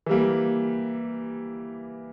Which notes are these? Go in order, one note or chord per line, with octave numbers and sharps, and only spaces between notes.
E3 G3 A#3